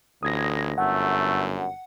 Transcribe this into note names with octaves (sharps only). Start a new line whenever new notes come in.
A1 D2 D#6 G#6 A#6
G1 F#2 A3 F#5